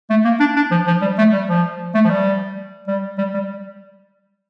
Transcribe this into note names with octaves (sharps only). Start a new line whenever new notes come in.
A3
A#3
D4
D4
F3
F3
G3
A3
G3
F3
A3
F3
G3
G3
G3
G3